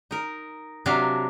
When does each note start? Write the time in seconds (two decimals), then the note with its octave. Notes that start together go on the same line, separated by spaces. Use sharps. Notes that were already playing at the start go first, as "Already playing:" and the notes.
0.11 D#4 A#4
0.86 C3 F#3 D4 A#4 F5